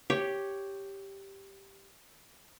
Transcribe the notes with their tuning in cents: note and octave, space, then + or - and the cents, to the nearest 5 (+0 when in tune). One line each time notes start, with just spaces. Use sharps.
G4 +0 C#5 +0